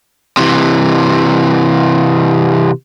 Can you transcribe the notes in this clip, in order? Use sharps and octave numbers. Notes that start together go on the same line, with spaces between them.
C3 E3